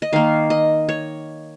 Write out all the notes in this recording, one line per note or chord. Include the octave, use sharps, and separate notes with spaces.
D#5
D#3 A#3 F5
D#5
C#5